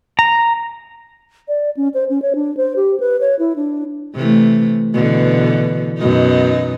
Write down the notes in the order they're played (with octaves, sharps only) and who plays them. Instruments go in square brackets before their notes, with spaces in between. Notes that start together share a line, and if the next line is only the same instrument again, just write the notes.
[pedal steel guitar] A#5
[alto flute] D5
C#4
C5
C#4
C#5
D4
C5
G4
B4
C#5
E4
D4
[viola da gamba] C3 E3 A3
B2 D3 E3
F#2 B2 D#4